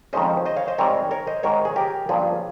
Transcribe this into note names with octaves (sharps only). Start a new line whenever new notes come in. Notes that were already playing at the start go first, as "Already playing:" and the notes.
F2 D#3 G#3 C#4 C5 D#5
C5 D#5
C#5 F5
C5 D#5
G#2 G3 C4 A#4 C#5
A#4 C#5
C5 D#5
G#2 D#3 G#3 A#4 C#5
G#4
G4 A#4
G2 F3 A#3 C#4 F4 G#4